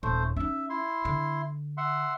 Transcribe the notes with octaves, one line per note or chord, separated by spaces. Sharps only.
D#1 A3 C5
C#4 D#4 E5
E4 C6
D3
E5 F#5 C6